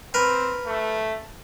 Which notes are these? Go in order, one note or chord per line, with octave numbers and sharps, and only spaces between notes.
C4 A#4 B4
A3